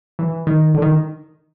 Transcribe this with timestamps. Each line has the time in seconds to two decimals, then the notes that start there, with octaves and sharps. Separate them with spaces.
0.19 E3
0.47 D#3
0.74 D3
0.82 D#3